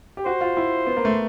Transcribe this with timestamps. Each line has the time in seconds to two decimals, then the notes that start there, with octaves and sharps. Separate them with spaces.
0.17 G4
0.26 F#4 C5
0.41 F4
0.57 E4
0.87 B3
0.97 A#3
1.05 A3